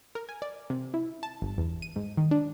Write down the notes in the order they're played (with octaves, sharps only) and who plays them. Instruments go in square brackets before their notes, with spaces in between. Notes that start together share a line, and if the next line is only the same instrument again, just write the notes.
[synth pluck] A#4
G#5
D5
C3
E4
A5
G1
E2
D#7
G#2
D#3
D4